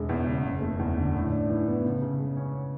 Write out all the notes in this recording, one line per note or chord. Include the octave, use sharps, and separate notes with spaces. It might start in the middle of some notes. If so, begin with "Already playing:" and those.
Already playing: E1 G#3
E2
C#3
F#1
A3
E2
D3
A2
D4
E3
B3
C#3
C#3
G#3
C#4